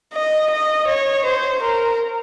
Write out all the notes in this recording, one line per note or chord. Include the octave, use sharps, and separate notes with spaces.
D#5
D#5
C#5
C5
A#4